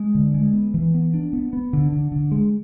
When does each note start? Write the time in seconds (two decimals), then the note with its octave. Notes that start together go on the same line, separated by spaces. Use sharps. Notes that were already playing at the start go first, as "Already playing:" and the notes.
Already playing: G#3
0.15 D3
0.34 G#3
0.54 B3
0.74 E3
0.94 B3
1.14 D4
1.33 B3
1.53 B3
1.73 D3
1.92 D3
2.12 D3
2.32 G#3